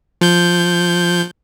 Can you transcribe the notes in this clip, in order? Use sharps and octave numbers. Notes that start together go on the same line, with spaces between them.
F3 G6